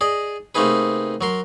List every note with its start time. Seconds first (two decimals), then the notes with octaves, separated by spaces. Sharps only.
0.01 G#4 D5 D#5
0.55 C3 A3 A#3 D#4 G#4 B4
1.21 F#3 A#4 C6